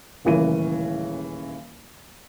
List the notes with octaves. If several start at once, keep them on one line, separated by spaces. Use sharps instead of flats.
D#1 A1 C#3 E3 A#4 D#7